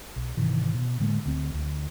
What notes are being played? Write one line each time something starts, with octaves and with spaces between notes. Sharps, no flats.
B1
G#2 C3 D#3 E3
B2
A2 D3 G#3 A#3
D2 C4
D2